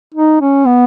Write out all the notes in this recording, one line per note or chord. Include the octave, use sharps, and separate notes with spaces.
D#4
C#4
B3